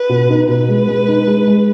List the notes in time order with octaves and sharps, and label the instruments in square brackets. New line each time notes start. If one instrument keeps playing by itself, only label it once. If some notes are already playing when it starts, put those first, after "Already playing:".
Already playing: [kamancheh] B4
[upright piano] B2
D#4
[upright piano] B2 [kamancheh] B4
[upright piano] G#3
G#3
D#4
G#3
G#3